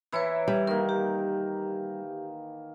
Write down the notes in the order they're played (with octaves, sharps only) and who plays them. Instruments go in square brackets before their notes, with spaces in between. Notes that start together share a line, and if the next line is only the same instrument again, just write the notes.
[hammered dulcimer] E3 E4 [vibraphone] B4 C#5 A#5
[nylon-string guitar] G3
[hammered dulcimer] D#3 A#3 [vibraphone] A#4
[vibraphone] G4